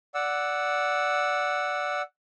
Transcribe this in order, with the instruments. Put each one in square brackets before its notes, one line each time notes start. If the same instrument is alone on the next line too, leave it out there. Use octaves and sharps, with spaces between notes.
[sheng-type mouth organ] D5 F#5 E6